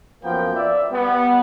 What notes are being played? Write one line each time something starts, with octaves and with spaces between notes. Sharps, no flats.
F#2 F3 A#3 B3 G5
D5 E5
G3 B3